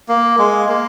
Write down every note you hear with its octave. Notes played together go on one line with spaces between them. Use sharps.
A#3
G#3
A#3